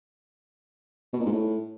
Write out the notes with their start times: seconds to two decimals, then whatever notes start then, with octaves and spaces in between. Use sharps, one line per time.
1.13 B2
1.19 A#2
1.26 G#2
1.32 A2